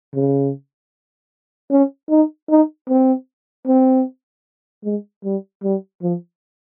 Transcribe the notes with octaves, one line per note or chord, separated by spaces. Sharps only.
C#3
C#4
D#4
D#4
C4
C4
G#3
G3
G3
F3